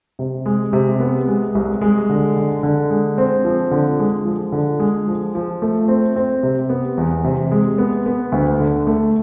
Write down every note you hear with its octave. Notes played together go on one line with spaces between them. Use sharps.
C3
G#3
C3
B3
G#3
C2
G#3
D3
D3
D3
G#3
C4
F3
D3
G#3
F3
D3
G#3
F3
F3
A3
C4
C4
C3
B3
E2
C3
G#3
B3
B3
D2
D3
A3